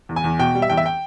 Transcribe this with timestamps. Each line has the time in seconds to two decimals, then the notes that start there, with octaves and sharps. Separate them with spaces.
0.09 E2
0.16 G#5
0.24 E2
0.39 B2 G5
0.55 G3
0.62 E5
0.70 E2 G5
0.77 E5
0.86 G5